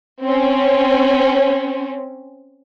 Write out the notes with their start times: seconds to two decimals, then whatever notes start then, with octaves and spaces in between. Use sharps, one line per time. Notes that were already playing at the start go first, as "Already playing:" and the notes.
0.24 C4 C#4